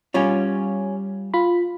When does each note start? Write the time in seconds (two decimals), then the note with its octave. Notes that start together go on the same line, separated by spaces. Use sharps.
0.14 G3 C#4 F4 C#5 G#5
1.34 F4 B5